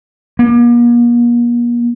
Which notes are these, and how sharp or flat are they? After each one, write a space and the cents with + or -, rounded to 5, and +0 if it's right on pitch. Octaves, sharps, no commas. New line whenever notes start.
A#3 +40